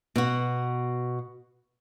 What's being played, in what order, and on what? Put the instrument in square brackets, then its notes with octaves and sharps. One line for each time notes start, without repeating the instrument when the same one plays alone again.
[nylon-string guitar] B2 F#4